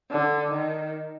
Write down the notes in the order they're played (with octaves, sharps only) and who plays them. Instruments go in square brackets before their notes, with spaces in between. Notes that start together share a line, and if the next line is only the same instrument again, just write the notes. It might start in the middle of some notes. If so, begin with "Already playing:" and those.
[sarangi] D3
D#3